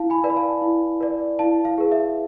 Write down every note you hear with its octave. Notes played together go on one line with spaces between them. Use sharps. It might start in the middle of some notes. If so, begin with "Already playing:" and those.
Already playing: E4 F5 A5
G#5 B5
B4 D5
B5
F5 A5
E4
B4 D5
E4 F5 A5
F5
G#4 B4
E5